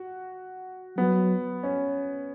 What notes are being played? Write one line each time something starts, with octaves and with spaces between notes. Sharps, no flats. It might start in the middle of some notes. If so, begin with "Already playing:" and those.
Already playing: F#4
F#3 B3
C#4